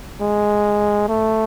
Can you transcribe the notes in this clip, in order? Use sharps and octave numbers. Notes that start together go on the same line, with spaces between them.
G#3
A3